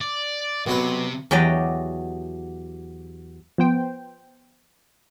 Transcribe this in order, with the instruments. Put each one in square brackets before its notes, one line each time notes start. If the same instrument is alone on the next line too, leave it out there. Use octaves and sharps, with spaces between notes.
[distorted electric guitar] D5
[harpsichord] B1 F#3 B4 [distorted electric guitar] C3
[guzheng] E2 F#3 G4 D5 D#5
[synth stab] F3 B3 C5 G5